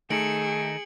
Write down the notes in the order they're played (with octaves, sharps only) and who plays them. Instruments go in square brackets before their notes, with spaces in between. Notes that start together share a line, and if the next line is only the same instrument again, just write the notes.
[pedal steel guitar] D#3 D#4 A4 [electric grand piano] A3 [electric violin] G#4 [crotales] C#7 D7 F#7